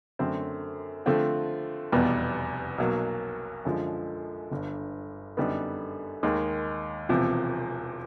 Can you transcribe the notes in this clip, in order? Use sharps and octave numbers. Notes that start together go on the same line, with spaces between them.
F#2 D3 F#3 A3 C4
D3 F3 A3 C4 F4
F1 E2 B2 G3 B3
B1 B2 F#3 A#3
F#2 D3 F3 G#3
G1 G2 D3
F#2 D3 G3 B3 D#4
D#2 D#3 G#3
E1 E2 C3 F3